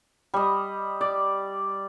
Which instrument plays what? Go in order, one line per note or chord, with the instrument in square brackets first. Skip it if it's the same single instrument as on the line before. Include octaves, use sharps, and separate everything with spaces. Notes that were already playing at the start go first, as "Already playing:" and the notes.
[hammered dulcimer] G3 D#5
D5